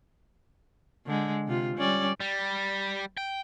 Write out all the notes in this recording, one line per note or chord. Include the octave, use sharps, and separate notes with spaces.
D3 G#3
C3 F4
G3 C#4 D5
G3
G5